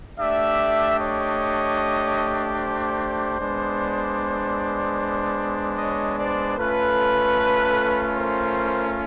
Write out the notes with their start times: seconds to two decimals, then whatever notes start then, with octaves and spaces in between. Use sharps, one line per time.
0.19 A3 D4 G4 D5 E5
0.99 C#5 D#5
2.58 C5 D5
3.39 G#3 B3 D4
5.77 C#5 D#5
6.18 C5 D5
6.57 A3 C#4 F4 A4 B4
8.17 A#4 C5